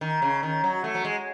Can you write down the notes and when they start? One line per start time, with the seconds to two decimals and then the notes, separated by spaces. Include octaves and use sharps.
0.01 D#3
0.22 C#3
0.43 D#3
0.64 F#3
0.84 A3
0.95 F#3
1.05 G#3